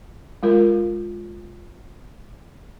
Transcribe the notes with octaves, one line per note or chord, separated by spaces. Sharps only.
G#3 F4 A#4